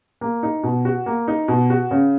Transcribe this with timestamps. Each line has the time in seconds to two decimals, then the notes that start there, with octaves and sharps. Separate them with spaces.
0.21 A#3
0.43 D#4
0.63 B2
0.85 F#4
1.06 A#3
1.28 D#4
1.48 B2
1.70 F#4
1.91 C#3